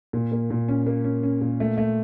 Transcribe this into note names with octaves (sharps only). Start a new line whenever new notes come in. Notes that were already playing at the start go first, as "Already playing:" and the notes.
A#2
A#3
A#2
C#4
A#3
C#4
C#4
A#2
A3
A3